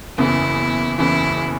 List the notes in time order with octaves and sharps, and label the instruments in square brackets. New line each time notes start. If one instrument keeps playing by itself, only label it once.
[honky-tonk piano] F#1 E2 C#3 E3 [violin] E4
[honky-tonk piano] F#1 E2 C#3 E3 [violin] E4